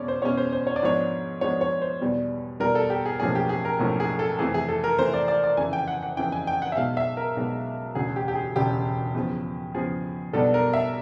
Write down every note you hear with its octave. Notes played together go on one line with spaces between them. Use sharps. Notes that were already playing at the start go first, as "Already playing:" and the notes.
Already playing: E2 B2 G#3 C#4 C#5 D5
C5
E2 B2 G#3 C#4 C#5
C5
C5
C#5
D5
G#2 F3 G#3 B3 D4 C#5
G#2 F3 G#3 B3 D4 C#5
C#5
C5
E2 B2 G3
E2 B2 G3 A#4
A4
G4
G#4
B1 A2 F3 A#3 C#4 G#4
G4
G#4
A#4
B1 A2 F3 A#3 C#4
G#4
A4
F2 C3 E3 A3 G#4
G#4
A4
A#4
F2 C3 E3 A3 C5
D5
D5
D5
F2 C#3 E3 G#5
G5
F#5
F#5
F2 C#3 E3 G5
G#5
G5
F#5
E5
B1 B2 G#3 F5
E5
A#4
B1 B2 G#3
E1 D2 C#3 G#4
G4
G4
G#4
E1 D2 C#3 G4
E2 C#3 F3
E2 C#3 F3 G#4
B1 B2 G3 B3 D4 A4
A#4
E5